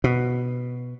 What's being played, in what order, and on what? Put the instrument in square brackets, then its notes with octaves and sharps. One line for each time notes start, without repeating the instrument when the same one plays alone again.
[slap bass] B2